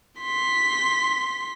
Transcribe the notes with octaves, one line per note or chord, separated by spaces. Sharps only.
C6 B6